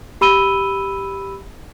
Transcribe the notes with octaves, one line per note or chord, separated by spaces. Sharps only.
G4 B5 E6 D#7 G7